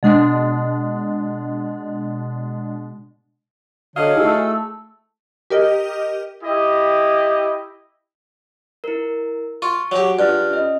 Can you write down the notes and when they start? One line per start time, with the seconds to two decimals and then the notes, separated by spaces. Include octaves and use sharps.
0.03 B2 G#3 D4
3.96 D3 F#3 C#5 D#5 F5
4.17 A3 D#4 E4 G#4 E6
5.50 G4 A#4 D#5
6.42 E4 G4 D#5
8.84 E4 A#4
9.62 F4 C#6
9.92 F#3 G4 G#4 F#5
10.19 G2 F4 F6 F#6
10.50 C#4 D#5